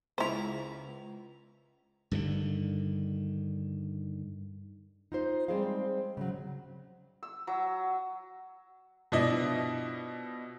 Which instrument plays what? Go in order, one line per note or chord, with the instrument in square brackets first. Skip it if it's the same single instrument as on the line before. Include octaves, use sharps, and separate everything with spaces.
[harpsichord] C#2 A#5 [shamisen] E4 C5
[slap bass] G2 D3 D#3
[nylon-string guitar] D#4 F4 C5
G3 G#3 C4 G#4 C5 F5
C#3 F#3
[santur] E6
F#3
[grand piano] B2 F3 D4 E4 D#5